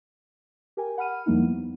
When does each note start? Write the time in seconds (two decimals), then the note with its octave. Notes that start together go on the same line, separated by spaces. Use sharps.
0.77 G4 A#4 G5 G#5
0.98 F#5 B5 F6 D#7
1.26 F2 F3 G3 A#3 D#4 E4
1.42 B3